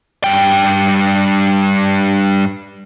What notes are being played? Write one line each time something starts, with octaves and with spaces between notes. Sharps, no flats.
G2 G5